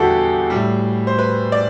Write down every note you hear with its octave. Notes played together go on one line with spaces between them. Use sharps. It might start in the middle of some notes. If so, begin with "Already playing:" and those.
Already playing: E2 D3 G3 E4 F#4 G4 A4
A2 G3
C5
B4
D5